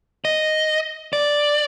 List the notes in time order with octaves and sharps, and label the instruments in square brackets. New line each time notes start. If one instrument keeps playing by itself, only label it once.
[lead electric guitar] D#5
D5